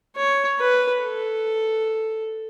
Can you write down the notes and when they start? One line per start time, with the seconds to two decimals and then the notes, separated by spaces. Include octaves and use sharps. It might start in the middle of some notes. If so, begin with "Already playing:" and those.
0.16 C#5
0.59 B4
1.02 A4